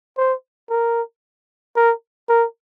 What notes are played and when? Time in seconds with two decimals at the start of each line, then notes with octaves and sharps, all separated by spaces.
0.18 C5
0.70 A#4
1.76 A#4
2.29 A#4